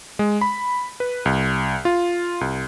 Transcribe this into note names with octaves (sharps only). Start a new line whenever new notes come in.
G#3
B5
B4
C2
F4
C2